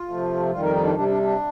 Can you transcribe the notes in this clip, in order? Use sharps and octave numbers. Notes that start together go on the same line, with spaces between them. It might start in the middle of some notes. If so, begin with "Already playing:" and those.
Already playing: F4
C3 F3 A3
F2 D#3 G3 F4
A#4
D#4
D4
C3 G3 D4
D4
D4